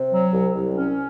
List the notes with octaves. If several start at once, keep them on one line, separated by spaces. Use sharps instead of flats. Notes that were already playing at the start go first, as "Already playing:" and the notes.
Already playing: C3
F#3
C2
C2
C#4